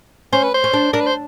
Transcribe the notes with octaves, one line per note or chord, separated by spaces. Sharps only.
C#4 C5
B4
C5
C#4
D4
D4 A#4
B4
C5